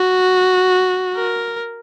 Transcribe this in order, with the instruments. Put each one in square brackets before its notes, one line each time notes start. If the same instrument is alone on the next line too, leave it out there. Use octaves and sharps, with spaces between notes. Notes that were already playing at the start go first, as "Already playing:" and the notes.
Already playing: [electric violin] F#4
A#4